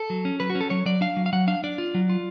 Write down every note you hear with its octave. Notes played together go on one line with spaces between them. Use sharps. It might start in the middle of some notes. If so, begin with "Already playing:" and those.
Already playing: A4
F#3
C#4
F#3 B4
F#4
C#4
A4
F#3 C#5
F#3 D5
D4 F5
F#3
F5
F#3 F#5
D4 F5
D4 D5
F4
F#3
F4